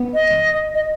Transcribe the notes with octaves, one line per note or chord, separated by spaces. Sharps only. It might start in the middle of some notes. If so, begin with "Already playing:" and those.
Already playing: B3
D#5
D#5